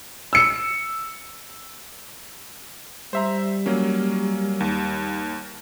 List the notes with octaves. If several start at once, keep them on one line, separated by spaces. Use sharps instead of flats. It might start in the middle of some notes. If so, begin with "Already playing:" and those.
E6 C#7
G3 C5 E5 A#5
F#3 A#3 C#4
D#2